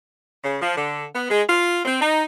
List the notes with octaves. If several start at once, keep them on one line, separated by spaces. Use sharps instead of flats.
C#3
F3
D3
B3
G#3
F4
C4
D#4